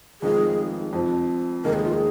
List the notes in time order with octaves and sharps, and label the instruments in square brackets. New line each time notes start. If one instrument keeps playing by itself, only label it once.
[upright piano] F1 F2 D#3 G#3 F4 [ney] G#4
[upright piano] F2 F3 C4
[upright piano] F1 D#2 D#3 G#3 D#4 [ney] A#4
[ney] G#4
F4
G#4